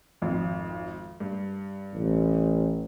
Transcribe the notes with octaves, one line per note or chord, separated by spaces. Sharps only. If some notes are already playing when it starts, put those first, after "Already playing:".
G#1 F2
G2
A1